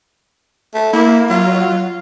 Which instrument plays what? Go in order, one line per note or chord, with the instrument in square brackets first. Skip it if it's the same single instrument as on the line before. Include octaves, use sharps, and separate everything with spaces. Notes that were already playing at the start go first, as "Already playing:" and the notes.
[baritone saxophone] A3
[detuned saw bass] A#3 [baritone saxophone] E4
[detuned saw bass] F#3 [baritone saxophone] F4